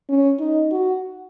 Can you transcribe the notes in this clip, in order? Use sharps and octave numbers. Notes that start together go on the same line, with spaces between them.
C#4
D#4
F#4